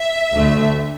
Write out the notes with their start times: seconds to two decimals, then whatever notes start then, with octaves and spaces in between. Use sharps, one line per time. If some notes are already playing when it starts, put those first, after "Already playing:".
Already playing: E5
0.34 D2 D3 A3